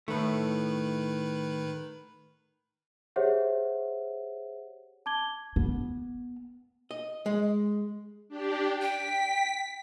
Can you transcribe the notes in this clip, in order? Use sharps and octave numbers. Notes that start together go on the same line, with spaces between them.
A2 D#3 A3 B4
G4 G#4 C5 C#5 E5 F#5
A5 D6 G#6 G7
B3
D#5
G#3
D4 G4
G5 B6